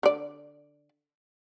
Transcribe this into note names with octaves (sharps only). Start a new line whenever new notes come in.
D3 D5